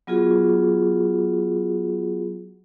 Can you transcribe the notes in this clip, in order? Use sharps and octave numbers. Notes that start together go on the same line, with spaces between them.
F#3 B3 F4 F#4 G#4